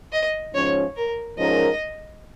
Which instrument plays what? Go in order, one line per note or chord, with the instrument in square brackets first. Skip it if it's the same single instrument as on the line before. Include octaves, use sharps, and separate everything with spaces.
[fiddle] D#5
[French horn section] G#2 F3 C#4 [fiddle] C#5
[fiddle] A#4
[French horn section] G#2 F3 C#4 A#4 [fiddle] D#5